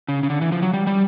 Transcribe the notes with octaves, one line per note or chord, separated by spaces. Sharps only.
C#3
C#3
D3
E3
F3
F#3
G3
G3